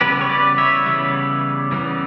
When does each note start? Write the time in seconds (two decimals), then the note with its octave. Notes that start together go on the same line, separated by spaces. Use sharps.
0.01 C#3 E3 G3 B3 G4 B4
0.21 C#5
0.29 B4 D5
0.58 C#5 E5
0.86 C#3 E3 G3 B3
1.71 C#3 E3 G3 B3